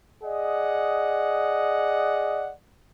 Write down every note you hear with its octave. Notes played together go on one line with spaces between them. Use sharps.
G#4 D5 D#5 F#5